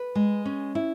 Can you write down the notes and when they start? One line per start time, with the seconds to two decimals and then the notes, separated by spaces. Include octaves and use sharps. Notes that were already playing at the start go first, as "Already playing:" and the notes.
Already playing: B4
0.15 G#3
0.45 C#4
0.75 E4